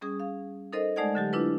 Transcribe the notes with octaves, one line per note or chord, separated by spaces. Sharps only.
G3 C#4 G#4 D#6
F5
D#4 A4 A#4 C5 D#5
G#3 A3 D#4 D5 F#5 G#6
D3 F#3 G4
D4 E4 F4 B4